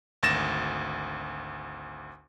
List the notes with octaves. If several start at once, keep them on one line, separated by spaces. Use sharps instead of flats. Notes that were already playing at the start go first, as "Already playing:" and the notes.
G#1 D2 A6 A#6 E7